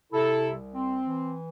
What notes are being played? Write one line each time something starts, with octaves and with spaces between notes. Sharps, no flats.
C3 E4 A4
C2
C4
E3